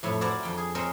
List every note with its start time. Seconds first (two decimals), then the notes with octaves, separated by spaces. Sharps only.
0.03 F2 A2 C#5 E5
0.21 E4 F#4 A#4 C5 D5 F5
0.43 F2 G5
0.58 G#4
0.75 C4 G#4 A#4 C5 C#5 D#5